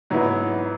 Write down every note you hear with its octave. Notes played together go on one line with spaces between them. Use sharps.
G#2 F#3 B3 E4